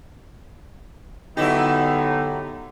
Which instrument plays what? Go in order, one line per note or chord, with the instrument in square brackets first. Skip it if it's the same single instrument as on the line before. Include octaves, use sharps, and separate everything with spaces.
[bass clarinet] D3 [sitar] F#3 E4 G4 [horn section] B3 D#4